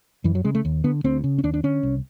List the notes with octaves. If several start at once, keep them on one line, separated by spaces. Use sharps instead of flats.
F#2 E3
F#3
C#3 G#3
A3
D#2
D3 B3
D2 C4
C#3
C#4
D#2 D4
D4
D3 C#4
C2